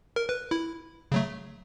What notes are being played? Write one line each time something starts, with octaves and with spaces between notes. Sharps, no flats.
A#4
B4
E4
C#3 F#3 A3